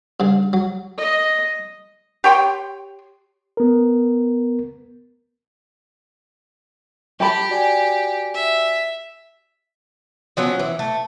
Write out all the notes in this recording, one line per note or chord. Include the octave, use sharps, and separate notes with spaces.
G2 C#3
F#3
D#5
G4 C#5 G5 C6
B3 A#4
G4 G5 A5 B5
F#4 D5 G#5
E5
F3 F#3 B3 C#4
E3
A3